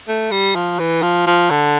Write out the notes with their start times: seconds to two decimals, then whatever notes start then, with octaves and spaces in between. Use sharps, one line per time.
0.08 A3
0.31 G3
0.56 F3
0.79 E3
1.03 F3
1.27 F3
1.50 D3